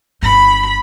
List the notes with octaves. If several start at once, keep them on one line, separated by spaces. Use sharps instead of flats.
G1 B5